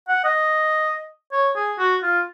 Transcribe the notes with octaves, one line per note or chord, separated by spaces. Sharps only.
F#5
D#5
C#5
G#4
F#4
F4